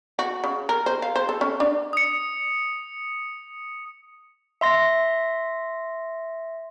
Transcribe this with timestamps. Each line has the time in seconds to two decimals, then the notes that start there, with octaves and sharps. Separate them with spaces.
0.19 F#4
0.44 C#3
0.69 A#4
0.86 C5
1.02 F5
1.16 C5
1.29 A4
1.41 C#4
1.60 D4
1.93 D#6 C#7
4.61 E5 C6 A#6